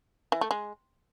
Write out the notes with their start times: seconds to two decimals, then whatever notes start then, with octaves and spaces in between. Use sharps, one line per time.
0.32 E3
0.41 A3
0.51 G#3